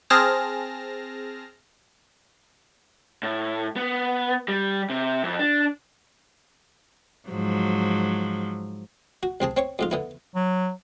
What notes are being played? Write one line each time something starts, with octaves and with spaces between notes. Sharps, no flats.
C4 G#4 A5 F6 A#6
A2
B3
G3
C3
F2
D4
G#2 F3 F#3
F#4
C2 C4 G#4 A5
C4 C#5 C#6
F2 G#2 F4
D3 B3 E4
F#3